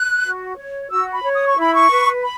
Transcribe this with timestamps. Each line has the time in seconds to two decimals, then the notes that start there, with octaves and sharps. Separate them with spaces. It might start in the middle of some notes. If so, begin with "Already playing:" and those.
Already playing: F#6
0.24 F#4
0.57 C#5
0.90 F#4 E6
1.13 B5
1.23 C#5
1.34 D#6
1.47 C#6
1.56 E4
1.61 B5
1.75 C#6
1.90 B4
2.22 B5